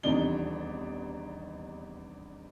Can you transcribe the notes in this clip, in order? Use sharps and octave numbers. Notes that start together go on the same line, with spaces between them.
D#1 E2 C3 D4 D#4 G7